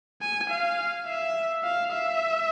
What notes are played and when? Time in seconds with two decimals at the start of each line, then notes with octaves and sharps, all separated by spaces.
0.21 G#5
0.49 F5
1.06 E5
1.64 F5
1.91 E5